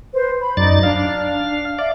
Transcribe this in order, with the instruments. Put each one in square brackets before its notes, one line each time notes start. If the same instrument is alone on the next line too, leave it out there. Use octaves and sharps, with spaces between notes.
[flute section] B4 C5
B5
[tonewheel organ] F#2 D5 A6 [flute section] D#4
[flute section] D4 [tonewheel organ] F5
[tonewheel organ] D5 [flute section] E5 F5